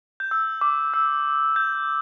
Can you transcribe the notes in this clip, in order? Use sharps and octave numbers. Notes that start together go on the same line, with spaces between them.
G6
E6
D6
E6
G6